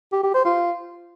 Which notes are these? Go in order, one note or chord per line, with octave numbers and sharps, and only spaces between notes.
G4
G4
C5
F4